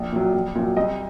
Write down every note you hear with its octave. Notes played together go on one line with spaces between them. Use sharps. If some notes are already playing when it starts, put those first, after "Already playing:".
Already playing: A#1
A#2 F#3
A#1
A#2 F#3
C2 D#5